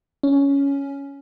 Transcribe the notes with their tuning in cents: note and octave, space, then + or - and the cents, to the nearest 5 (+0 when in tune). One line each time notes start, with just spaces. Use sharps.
C#4 +10